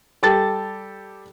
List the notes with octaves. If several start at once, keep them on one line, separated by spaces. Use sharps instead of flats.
G3 G4 A4 A5 A6